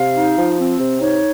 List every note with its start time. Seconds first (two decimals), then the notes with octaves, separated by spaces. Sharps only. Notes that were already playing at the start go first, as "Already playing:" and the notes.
Already playing: C3 F5
0.15 D#4
0.36 F3
0.58 C4
0.80 C3
1.00 D#4 C#5